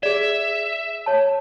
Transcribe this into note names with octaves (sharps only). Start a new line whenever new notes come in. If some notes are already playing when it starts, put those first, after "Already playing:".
G#4 D5 E5
C#5 A5